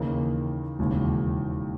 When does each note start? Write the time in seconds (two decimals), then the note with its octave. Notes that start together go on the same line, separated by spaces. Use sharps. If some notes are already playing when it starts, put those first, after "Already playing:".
Already playing: D#2 C#3 E3 A#3 D#4
0.79 E1 D#2 C#3 E3